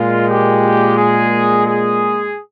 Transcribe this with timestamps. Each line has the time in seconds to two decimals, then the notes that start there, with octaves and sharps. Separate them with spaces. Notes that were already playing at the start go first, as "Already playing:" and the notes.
Already playing: A#2 G#3 F4
0.28 G4
0.97 G#4
1.65 G#4